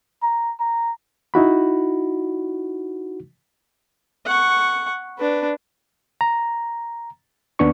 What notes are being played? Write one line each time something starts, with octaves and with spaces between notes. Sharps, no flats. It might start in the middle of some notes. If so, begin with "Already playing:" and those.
A#5
A#5
D#4 E4 F#4 B5
F#5 C#6
D4 B4
A#5
D#2 B3 D4 C#6